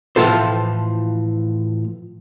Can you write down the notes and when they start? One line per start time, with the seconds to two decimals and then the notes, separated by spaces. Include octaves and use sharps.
0.16 A2 E3 F3 F4 A4 C5